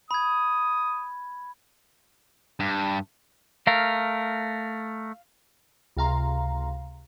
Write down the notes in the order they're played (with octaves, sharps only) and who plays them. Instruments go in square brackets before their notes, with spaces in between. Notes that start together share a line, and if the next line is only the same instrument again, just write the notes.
[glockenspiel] B5 G#6 [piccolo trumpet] D#6
[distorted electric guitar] G2
[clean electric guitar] A3 A#4 [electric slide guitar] F5
[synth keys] C#2 C3 F5 A#5 C6